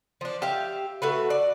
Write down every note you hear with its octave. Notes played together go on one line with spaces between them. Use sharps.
F3 D4
G4 E5 F5
A3 F#4 B4
D5